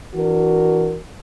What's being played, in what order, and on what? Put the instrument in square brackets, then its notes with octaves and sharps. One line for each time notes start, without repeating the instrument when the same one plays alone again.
[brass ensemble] E3 D4 F#4 A#4